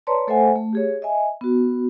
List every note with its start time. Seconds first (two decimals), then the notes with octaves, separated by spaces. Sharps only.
0.07 B4 C#5 D5 A5 A#5 C6
0.27 A3 A4 C5 E5 F#5 G#5
0.55 A3
0.73 G4 G#4 C#5
1.02 D#5 E5 G#5
1.41 B3 F#4